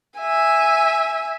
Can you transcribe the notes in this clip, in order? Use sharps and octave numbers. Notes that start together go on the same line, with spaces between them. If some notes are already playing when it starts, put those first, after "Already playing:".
E5 G#5